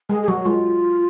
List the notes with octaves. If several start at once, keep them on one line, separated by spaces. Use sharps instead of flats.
G#3 G#4
G#4
F#3 F#4
G#3 F4